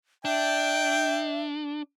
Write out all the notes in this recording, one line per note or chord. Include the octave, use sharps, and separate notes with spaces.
D4 E5 G5